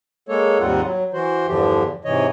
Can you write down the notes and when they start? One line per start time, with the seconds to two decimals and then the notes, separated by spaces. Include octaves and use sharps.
0.29 G#3 A#3 A4 C#5
0.60 D#2 G#2 G3 C4 F4 F#5
0.83 F#3
1.13 E3 F#4 C5
1.48 E2 G2 D3 F3 G4
2.05 G#2 C3 E3 C#5 D#5